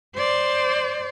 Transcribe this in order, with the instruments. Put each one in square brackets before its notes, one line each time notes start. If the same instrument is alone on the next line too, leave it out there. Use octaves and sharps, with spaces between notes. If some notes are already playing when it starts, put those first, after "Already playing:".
[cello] C5 D5